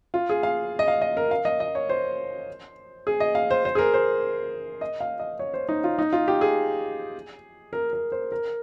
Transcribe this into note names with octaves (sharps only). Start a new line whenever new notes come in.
F4
G#4
F5
D#5
F5
D#5
A#4
F5
D#5
D#5
C#5
C5
G#4
D#5
F5
C5
C5
G#4
A#4
C5
D#5
F5
D#5
C#5
C5
D#4
F4
D#4
F4
G4
G#4
A#4
A#4
C5
A#4